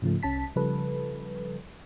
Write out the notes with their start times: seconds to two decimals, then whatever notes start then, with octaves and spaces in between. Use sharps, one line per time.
0.02 G#2 C#3 F3 A3
0.23 C2 C#4 A5 B6
0.56 C#3 F3 G3 A4 B4